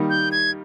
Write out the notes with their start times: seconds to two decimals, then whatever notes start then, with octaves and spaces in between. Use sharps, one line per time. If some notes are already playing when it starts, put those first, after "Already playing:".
Already playing: D#3 G3 A#3 D#4
0.10 G6
0.32 G#6